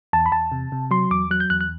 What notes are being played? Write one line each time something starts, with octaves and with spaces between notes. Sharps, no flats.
E2 A5
B5
E2 A5
C3
C3
F#3 C6
E2 D6
F#3 F#6
G6
E2 F#6
F#6